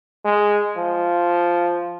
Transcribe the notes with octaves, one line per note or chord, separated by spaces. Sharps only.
G#3
F3